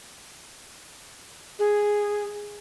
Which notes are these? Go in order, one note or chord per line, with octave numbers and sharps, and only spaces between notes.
G#4